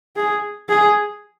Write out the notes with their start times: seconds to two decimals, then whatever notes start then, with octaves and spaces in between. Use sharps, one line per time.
0.16 G#4
0.69 G#4